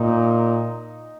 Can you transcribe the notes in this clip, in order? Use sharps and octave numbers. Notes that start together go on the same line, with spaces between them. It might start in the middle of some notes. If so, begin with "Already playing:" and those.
Already playing: A#2 D#4